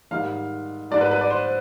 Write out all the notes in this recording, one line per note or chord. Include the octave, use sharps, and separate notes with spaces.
G#2 D#3 G3 F5
G#2 G3 D5
B4
B4
D5
C5